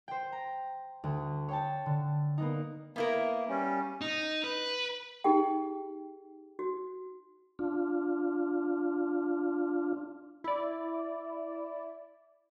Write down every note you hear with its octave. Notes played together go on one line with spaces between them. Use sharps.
C5 G5
A#5
D2
C#5 G5 A5
D3
A#3 B3 D#4
A#3 B3 E4 A#4
G3 C#4
D#4
B4
D#4 G4 G#4 G5
F#4
D4 F4
E4 D5